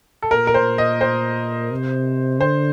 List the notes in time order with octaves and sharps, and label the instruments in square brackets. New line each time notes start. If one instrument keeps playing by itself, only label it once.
[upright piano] A4
[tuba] A#2 [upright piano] A#4
[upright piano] A#4
C5
D#5
C5
[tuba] C3
[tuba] D3 [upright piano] C5